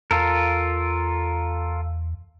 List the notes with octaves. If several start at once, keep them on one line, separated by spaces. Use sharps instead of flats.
E2 F4 A4 A#4